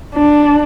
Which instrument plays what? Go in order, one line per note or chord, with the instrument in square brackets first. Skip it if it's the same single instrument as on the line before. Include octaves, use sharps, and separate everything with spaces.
[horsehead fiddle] D4